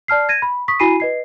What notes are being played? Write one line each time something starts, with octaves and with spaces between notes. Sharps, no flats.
D5 A5 F6 C7
G#6 A#6 D#7
B5
C#6 D#6 B6
E4 F#4 G#5 B5 C7 D#7
B4 D#5 C7